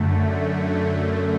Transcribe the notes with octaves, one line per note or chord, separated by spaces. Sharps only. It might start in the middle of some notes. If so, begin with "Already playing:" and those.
Already playing: F#2 D3 A3